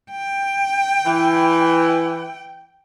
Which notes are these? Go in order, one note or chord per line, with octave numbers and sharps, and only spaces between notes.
G5
E3